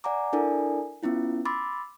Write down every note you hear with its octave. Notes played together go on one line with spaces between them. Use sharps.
D5 F#5 G#5 A#5 D6
D4 E4 A4 A#4 D5 G#5
B3 C#4 E4 F4
B5 C6 D6 E6 A6